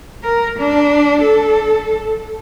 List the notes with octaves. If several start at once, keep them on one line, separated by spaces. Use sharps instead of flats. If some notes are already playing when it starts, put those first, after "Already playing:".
A#4
D4
A4